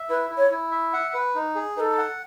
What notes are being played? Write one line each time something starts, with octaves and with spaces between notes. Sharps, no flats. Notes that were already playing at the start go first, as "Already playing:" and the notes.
Already playing: E5
E4 B4
E4
C#5
E4
E5
F#5
B4
D#4
G#4
D#4 A4 B4
F#5